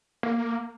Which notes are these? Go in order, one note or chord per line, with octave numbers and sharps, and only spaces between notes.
A#3